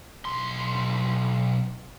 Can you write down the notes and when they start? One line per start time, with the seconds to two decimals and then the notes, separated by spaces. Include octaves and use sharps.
0.25 B1 C6